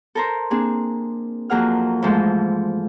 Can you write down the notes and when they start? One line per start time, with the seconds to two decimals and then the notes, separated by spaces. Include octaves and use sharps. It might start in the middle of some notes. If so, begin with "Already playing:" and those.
0.15 A4 A#4 C5
0.50 A#3 C4 D4 G#4
1.50 F2 F#3 A#3 G#4 F#5 F6
2.02 G#2 E3 F3 G#3 A3